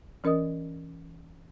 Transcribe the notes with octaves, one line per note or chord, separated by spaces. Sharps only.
E3 C#4 A#4 D#5 D#6